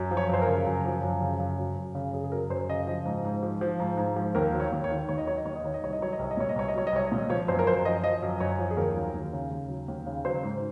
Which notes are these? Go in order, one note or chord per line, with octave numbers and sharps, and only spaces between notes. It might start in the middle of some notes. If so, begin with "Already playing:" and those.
Already playing: F#2
F3
C#5
F#2 C5
A#4
C#3
F#2
F3
F#2
C#3
F#2
F#3
F#2
C#3
F#2 G#4
G#4
F#3 A#4
F#2 C5
C#3 D#5
F3
G#2
G#2
F3
F3
G#2
G#2
F3
D#2 A#4
F#3
C#5
D#2
C#5
D#3
D#2 C#5
D#5
F#3 C#5
D#5
D#2 C#5
D#5
D#3 C#5
D#5
C2 C#5
D#5
F#3 C#5
D#5
C2 C#5
D#5
A#2 C#5
D#5
C2 C#5
D#5
F#3 C#5
D#5
C2 C#5
A#2
F3 C#5
F#2 C5
A#4
F#2 C5
F3 D#5
F3 D#5
F#2
F#2 C#5
F3
G#4
D#2 A#4
F#3
D#2
C#3
D#2
F#3
D#2
C#3
F#3 C5
G#2